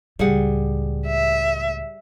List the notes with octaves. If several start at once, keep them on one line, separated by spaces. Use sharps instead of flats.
C#2 A2 G3 G#4 F#5
E5